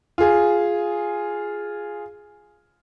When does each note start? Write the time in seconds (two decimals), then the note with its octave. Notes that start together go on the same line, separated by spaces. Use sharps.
0.18 F4 G#4